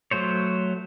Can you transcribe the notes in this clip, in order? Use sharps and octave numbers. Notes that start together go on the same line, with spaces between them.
F#3 A3 C5 C#5